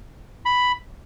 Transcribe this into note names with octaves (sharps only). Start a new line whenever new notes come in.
B5